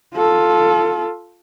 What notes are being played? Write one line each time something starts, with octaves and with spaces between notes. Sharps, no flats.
F4 A4